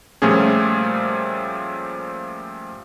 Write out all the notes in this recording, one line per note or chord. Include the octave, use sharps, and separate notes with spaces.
A#2 F3 G3 A3 C#4 G#4